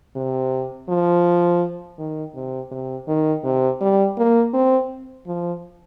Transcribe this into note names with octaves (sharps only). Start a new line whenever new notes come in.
C3
F3
D#3
C3
C3
D#3
C3
G3
A#3
C4
F3